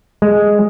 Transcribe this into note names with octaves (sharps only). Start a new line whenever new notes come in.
G#3